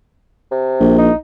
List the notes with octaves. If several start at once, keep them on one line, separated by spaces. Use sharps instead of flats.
C3
A#1
D#4